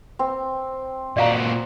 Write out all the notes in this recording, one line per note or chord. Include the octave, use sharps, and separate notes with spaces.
C4
A#2 F#4 D5 F5 A#5